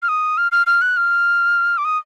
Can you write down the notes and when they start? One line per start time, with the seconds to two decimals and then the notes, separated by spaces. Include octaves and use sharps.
0.03 F6
0.08 D#6
0.38 F6
0.52 F6
0.67 F6
0.81 F#6
0.97 F6
1.78 D6
1.85 D#6